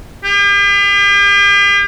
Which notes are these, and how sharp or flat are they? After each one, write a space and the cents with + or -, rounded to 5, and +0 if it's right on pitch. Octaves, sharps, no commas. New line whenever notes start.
G4 +45